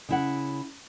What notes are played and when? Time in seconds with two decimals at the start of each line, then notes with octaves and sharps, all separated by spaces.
0.09 C#3 E4 F#5